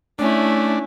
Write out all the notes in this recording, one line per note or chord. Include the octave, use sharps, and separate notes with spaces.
A3 C#4 D4 E4